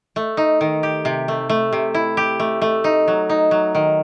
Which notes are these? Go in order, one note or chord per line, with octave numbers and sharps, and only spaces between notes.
A3
D#4
D#3
G4
C3
A3
A3
C3
E4
G4
A3
A3
D#4
F#3
D#4
F#3
D#3